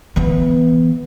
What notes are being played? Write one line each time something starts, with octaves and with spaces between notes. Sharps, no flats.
E3 B3